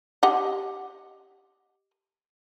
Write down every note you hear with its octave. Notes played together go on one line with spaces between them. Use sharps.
G4 D#5 F#5